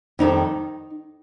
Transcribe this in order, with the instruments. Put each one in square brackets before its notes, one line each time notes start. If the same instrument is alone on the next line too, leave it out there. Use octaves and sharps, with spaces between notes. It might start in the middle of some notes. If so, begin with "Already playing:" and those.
[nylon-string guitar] F2 D#3 G3 D#4